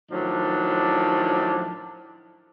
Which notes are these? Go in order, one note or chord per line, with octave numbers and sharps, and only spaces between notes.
A2 D#3 F3 F#3 D4